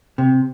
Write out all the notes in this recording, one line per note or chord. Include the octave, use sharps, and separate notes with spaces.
C3